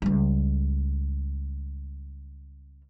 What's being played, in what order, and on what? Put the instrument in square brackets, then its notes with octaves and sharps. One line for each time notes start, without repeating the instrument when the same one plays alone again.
[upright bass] C#2 G3